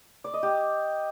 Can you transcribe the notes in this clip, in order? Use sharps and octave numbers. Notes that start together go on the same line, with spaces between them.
D5
D#5
G4